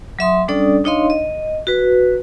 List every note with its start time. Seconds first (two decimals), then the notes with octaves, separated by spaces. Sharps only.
0.19 F#3 E5 C6 D#6
0.48 G3 C#4 D4 A4 D5 D#6
0.84 D4 D#4 C#5 D#5 F5 C6
1.10 D#5
1.67 F#4 B4